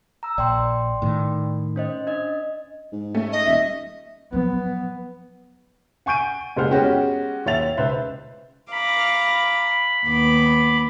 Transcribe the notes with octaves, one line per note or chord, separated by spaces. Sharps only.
A#5 E6
A#1 D5 G5 C6
A2 D#3
C#4 C5 D#5
D4 D#5
G#2
A3 C#4
D#5
D#1 E5
F3 F#3 B3
F#5 G#5 C#6 G6 D7 D#7
F#1 G3 G#3 C5 F#5 F6
G#3 B3 C#4 F#4 G4
D#2 C#5 E5 A6 F7
C#2 B4 C5 E5
F5 A#5 B5 D6
D#2 B3 D6